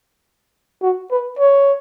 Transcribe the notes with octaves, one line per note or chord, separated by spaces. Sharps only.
F#4
B4
C#5